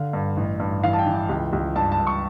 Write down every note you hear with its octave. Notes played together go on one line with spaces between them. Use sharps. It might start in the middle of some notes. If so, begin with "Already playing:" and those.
Already playing: D3 F5
G2
A1
G2
E3 F5
A5
G5
E3
G5
C#2
C#2
G2 A5
A5
G2
C#6